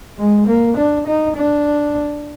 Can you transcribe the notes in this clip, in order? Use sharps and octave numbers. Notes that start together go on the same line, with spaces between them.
G#3
A#3
D4
D#4
D4